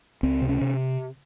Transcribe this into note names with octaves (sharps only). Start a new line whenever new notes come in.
C#2 C4
C3
C#4
C3